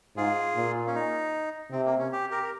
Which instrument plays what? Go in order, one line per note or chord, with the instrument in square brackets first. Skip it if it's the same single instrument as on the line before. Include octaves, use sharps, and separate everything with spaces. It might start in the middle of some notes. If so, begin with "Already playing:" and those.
[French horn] G#2 [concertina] F4 G#4
[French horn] A#2
[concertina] C#4
D#4
[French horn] C3 [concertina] C4
[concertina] A#3
C#4
G4
G4 A#4
A#4